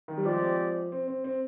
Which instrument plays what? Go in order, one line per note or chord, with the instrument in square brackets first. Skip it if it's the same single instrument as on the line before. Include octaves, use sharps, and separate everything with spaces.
[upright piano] D#3
G3
[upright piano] F3 [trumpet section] G#3 C4 G4 D5
[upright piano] C4
C4
C4